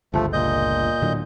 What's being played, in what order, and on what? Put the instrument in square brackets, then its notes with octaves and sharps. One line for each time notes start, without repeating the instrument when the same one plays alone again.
[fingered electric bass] G1 C#2 [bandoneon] F3 A3
[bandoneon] A#2 D#5 G6
[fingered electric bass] A2 D3 F#3